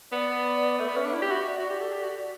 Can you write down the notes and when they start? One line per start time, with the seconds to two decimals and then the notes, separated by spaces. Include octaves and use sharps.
0.12 B3 D5
0.79 A3 E5
0.88 B3
0.96 C#4
1.05 D4
1.13 E4
1.22 G4
1.30 F#4
1.48 D5
1.59 F#4
1.70 G4
1.81 A4
1.92 G4
2.03 F#4